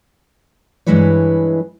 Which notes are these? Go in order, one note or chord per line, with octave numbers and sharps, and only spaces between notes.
G2 E3 G#3 E4 B4 C#5